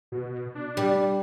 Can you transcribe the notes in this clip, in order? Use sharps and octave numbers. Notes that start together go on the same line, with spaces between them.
B2
D4
G3